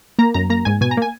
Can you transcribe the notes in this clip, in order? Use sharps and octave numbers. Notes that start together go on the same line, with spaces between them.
A#3 A#5
F#2 A#5
A#3 A#5
G#2 G#5
B2 G#5
A#5
A#3 G#5